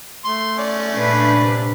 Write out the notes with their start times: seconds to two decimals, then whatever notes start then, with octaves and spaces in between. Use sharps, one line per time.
0.25 A3 C6
0.58 C#4 D5
0.93 A#2 D4 B4
1.37 C3